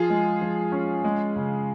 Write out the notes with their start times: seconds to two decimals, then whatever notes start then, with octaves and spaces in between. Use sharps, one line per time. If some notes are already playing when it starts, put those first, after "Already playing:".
Already playing: F3 F4 G#4
0.10 G#3
0.41 F3
0.72 C#4
1.04 G#3
1.36 C#3